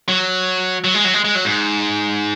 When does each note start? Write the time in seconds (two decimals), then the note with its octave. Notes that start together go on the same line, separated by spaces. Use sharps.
0.09 F#3
0.84 F#3
0.94 G#3
1.04 F#3
1.14 G#3
1.25 G#3
1.35 F#3
1.45 G#2